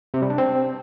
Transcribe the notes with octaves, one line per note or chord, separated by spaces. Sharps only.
C3
G3
D4
C4